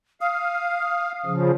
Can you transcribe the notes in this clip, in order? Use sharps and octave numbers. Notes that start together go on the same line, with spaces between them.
F5 D#6
C#3 F3